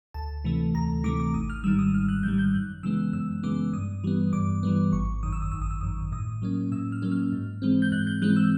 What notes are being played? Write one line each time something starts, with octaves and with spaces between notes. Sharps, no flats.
D2 A5
C3 E3 A3
D2 A#5
C3 E3 A3 D6
D6
G#1 D#6
F6
G#2 D#3 G3 E6
D#6
G#1 F6
F#6
G#2 D#3 G3 G6
G6
F#2 F#6
C#3 E3 G#3 B3 E6
F#2 E6
C#3 E3 G#3 B3 D6
G2 D#6
E3 G3 B3
G2 D6
E3 G3 B3
G#1 C#6
F#2 D#3 D#6
E6
D#6
G#1 E6
D#6
E6
F#2 D#3 D#6
A2 D#6
F#3 A#3 C#4
A2 E6
F6
F#3 A#3 C#4
F6
G#2
E3 G#3 C4
G6
G#2 F#6
G6
E3 G#3 C4 F#6
E6